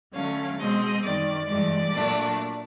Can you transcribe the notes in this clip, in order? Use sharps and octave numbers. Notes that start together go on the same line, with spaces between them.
D3 F#3 A3 C#4 F5
B2 G#3 C4 D#5
F#2 D#3 G3 D5
G2 E3 G#3 D5
A#2 F#3 A3 D4